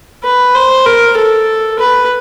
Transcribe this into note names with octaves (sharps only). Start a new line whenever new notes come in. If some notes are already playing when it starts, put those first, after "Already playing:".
B4
C5
A#4
A4
B4